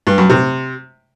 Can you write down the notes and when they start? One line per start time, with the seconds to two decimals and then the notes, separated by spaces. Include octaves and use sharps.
0.07 G2
0.18 F#2
0.30 C3